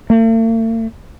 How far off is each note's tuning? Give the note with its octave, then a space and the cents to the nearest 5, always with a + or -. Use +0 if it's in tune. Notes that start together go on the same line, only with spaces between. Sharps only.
A3 +45